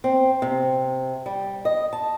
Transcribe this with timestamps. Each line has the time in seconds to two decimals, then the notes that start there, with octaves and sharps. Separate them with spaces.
0.04 C4
0.42 C3
1.26 G3
1.65 D#5
1.93 A5